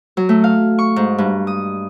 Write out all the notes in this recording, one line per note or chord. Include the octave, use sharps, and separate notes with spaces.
F#3
A3
F5
C#6
G#2
G2
D#6